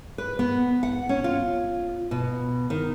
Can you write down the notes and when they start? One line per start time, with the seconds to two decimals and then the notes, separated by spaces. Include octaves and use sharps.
0.18 B4
0.39 B3
0.83 F#5
1.09 C#4
1.24 F4
2.11 B2
2.70 D#3